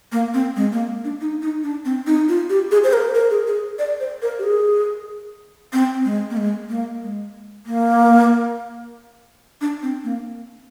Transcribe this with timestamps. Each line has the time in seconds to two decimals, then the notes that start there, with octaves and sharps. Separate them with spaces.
0.12 A#3
0.34 C4
0.56 G#3
0.72 A#3
1.04 D4
1.21 D#4
1.42 D#4
1.63 D4
1.85 C4
2.07 D#4
2.29 F4
2.49 G4
2.71 G#4
2.84 C5
2.93 A#4
3.14 A#4
3.31 G#4
3.47 G#4
3.79 D5
4.00 C5
4.22 A#4
4.39 G4
4.44 G#4
5.73 C4
6.05 G#3
6.30 A#3
6.37 G#3
6.69 A#3
7.03 G#3
7.66 A#3
9.61 D4
9.82 C4
10.04 A#3